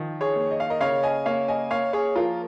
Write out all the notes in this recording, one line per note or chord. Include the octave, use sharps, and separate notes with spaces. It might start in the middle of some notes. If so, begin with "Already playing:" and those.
Already playing: D#3 F3
G#4 C#5
A#3
D#5
F5
A#4 D#5
C#3 C#5 F5
D#5 G#5
A#3 C#5 F5
D#5 G#5
A#3 C#5 F5
G#4 C#5
F3 F4 A#4